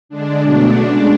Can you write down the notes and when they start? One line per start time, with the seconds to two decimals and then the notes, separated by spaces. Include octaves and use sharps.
0.09 D3 G#3 D4
0.42 B2 F#3 A3 D4
0.75 C#3 G#3